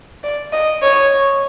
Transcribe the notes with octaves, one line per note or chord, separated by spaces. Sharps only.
D5
D#5
C#5